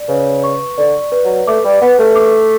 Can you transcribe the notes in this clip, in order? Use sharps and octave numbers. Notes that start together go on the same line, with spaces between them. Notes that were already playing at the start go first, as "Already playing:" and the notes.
Already playing: D5
C#3 B4
C#6
D3 D5
B4
F#3
A3 D6
G3
B3 B4
A3
D6